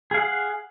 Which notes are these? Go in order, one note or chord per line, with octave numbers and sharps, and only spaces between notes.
G#4 F5 F#5